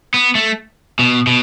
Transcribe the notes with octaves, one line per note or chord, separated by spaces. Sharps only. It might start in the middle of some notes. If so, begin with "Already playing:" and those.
B3
A3
B2
B2